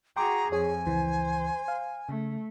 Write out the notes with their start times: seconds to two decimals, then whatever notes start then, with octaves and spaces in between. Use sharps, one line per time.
0.16 F#4 G#4 G5 A#5 C6 D6
0.52 F2 G#4 C#5 G#5
0.86 C#2 E3 C5
1.68 F5
2.09 C#3 A3